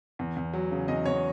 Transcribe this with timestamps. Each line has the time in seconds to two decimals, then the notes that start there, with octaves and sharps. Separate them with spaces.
0.19 E2
0.36 E2
0.53 F#3
0.71 C#3
0.88 E2 D#5
1.06 E2 C#5